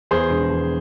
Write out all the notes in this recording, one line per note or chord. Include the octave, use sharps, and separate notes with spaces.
E2 G#4 C5
E1
E2